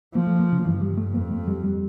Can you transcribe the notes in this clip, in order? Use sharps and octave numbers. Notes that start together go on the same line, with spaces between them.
F3 A#3
A3
A#3
C#3
G2 E3
G3
A3
F2 A#3
A3
G3
G3